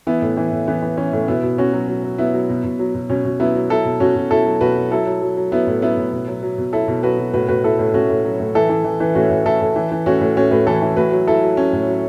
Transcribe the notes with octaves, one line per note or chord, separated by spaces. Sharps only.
E3 B3 E4
A2
E3
A2
E3 B3
E3
E3 C#4
A2
B2 B3 E4
B2
B2 C#4 F#4
F#3
F#3
F#3
F#3 B3 E4
F#3
B2
B2
F#3
B2
B2 C#4
B2
F#3 B3 E4
F#3
F#3 E4 A4
B2
B2 C#4 F#4
B2
B2 E4 A4
F#3
B2 F#4 B4
F#3
F#3 E4 A4
F#3
F#3
F#3
F#3 B3 E4
A2
F#3 B3 E4
A2
B2
F#3
F#3
B2
F#3 E4 A4
B2
F#3 F#4 B4
B2
A2 F#4 B4
A2 F#4 B4
A2 E4 A4
A2
A2 C#4 F#4
A2
F#3
A2
E3 E4 A4
E3
E3
E3
A2 C#4 F#4
A2
A2 E4 A4
A2
E3
E3
A2 C#4 F#4
A2
A2 C#4 F#4
A2 F#4 B4
E3 E4 A4
E3
A2 F#4 B4
F#3
F#3 E4 A4
F#3
F#3 C#4
A2
F#3